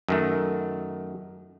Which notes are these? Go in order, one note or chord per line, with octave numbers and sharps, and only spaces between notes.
F#2 D#3 A3